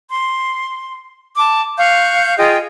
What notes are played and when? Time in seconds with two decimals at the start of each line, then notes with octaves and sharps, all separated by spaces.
0.10 C6
1.36 A5 D6
1.76 F5 C#6 F#6 G6
2.37 F4 G#4 D#5 G5